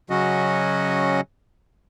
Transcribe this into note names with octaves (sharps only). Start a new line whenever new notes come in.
C#3 F#3 C#4 F#4 D#5